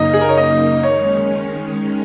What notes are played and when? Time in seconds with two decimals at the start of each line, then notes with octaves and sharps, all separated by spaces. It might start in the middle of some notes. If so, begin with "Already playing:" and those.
Already playing: F#2 C#3 A#3 D#4 D#5
0.13 G#4
0.21 A#4
0.29 C#5
0.37 D#5
0.83 D#3 G#3 C#4 C#5